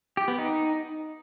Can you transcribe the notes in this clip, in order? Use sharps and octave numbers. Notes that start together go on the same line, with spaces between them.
G4
B3
D#4